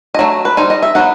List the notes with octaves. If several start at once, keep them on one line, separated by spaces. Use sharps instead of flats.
D#5
F#3 A3
B4
G3 D#4 C5
D#5
E5
F#3 B3 D#4 F#5